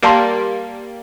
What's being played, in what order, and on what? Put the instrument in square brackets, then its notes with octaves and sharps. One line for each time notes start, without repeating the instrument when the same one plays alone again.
[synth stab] G3 A#3 [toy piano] A#4 F5 A5 C6